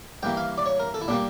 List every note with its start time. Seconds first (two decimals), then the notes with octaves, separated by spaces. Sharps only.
0.23 G2 E3 A#3 G5
0.37 F5
0.58 D5
0.66 C#5
0.80 A#4
0.94 A4
1.01 E4
1.08 A#2 G3 A#3 D4